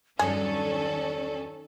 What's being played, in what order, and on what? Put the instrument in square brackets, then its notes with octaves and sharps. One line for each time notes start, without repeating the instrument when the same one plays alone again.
[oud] E2 G2 F#3 [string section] D#3 C#4 A4 [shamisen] G#4 [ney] D5